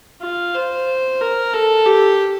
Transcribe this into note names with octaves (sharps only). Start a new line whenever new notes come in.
F4
C5
A#4
A4
G4